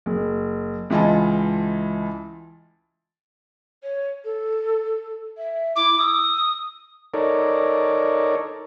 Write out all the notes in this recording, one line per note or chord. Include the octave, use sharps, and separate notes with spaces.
F#1
C#2 E3 F4 D#5 A5
C#5
A4
E5
E4 D6
D#6 E6
D#4 A4 A#4 C#5 D5